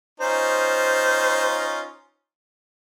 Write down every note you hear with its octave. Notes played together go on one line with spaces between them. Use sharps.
C#4 D#4 F4 C5